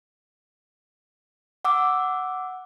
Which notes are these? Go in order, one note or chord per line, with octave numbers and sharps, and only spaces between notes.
F#5 D6 E6